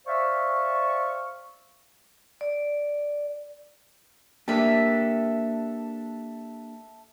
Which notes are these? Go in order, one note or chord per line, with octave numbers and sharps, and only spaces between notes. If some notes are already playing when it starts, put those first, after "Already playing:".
C5 D5 E5 F5 C#6
D5
A#3 D4 G4 A4 E5